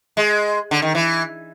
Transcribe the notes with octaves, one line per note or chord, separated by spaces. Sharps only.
G#3
D3
D#3
E3